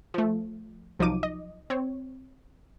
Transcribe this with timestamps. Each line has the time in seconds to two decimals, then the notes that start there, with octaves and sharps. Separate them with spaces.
0.14 F3 A3
0.99 C2 F3 F#3 D#4 D6 D#7
1.23 D#5
1.70 C4 C#5